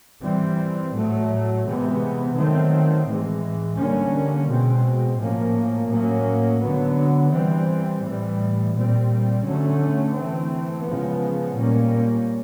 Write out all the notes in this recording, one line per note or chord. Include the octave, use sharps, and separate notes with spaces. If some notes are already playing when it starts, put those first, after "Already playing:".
E3 G3 C4
A2 F#3 A3
C3 E3 G#3 B3
D#3 F#3 A3 C4
A2 E3 G#3
D3 G3 A#3 C#4
B2 G#3 C4
A2 F3 A#3 C#4
A2 F#3 A#3 C#4
D3 F#3 B3
E3 G3 C4
A2 E3 G3
A#2 G3 C4
D3 F#3 A3 C#4
E3 A3 C4
C#3 F3 G#3 B3
A#2 G3 A#3 C#4